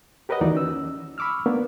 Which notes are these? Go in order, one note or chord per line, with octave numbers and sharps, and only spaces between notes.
G4 A#4 B4 C#5 D#5 F#5
D#2 E3 D#4 F#4 D5
C#4 E6
B5 C#6 D6 E6 F6
A#3 B3 D4